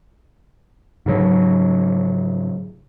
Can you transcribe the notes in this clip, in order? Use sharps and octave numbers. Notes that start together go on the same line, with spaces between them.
G#2 C#3 F#3